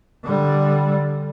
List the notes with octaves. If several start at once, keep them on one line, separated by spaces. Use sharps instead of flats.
D3 G3